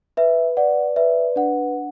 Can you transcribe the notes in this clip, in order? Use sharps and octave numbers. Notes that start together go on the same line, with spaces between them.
B4 E5
D5 F#5
B4 E5
D4 F#5